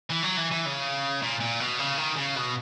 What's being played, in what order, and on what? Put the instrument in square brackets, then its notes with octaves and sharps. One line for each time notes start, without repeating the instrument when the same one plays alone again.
[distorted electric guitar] E3
F#3
E3
E3
C#3
A#2
A#2
B2
C#3
D#3
C#3
B2